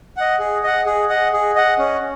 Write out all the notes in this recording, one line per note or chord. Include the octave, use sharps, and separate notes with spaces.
D#5 F#5
G#4
D#5 F#5
G#4
D#5 F#5
G#4
D#5 F#5
C#4